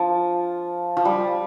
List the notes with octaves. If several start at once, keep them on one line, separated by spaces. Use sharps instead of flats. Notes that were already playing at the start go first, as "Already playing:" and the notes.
Already playing: F3
F3
G3